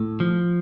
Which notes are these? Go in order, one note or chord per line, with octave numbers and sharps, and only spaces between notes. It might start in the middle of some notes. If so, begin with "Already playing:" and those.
Already playing: A2 A4
F3